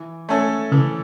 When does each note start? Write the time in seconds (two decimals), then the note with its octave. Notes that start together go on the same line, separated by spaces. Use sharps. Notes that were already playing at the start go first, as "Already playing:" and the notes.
Already playing: E3
0.29 A3 C#4 A4
0.72 C#3 E3